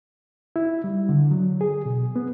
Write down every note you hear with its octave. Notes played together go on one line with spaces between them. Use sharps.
E4
G3
D3
F#3
G#4
B2
B3